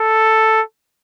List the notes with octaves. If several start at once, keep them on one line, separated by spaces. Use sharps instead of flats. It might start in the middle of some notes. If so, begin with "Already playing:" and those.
Already playing: A4